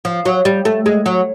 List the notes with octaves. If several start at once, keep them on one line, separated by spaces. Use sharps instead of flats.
F3
F#3
G3
A3
G#3
F#3